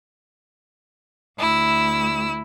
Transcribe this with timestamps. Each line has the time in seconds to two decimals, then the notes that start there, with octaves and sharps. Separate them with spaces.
1.38 D2 E4 E6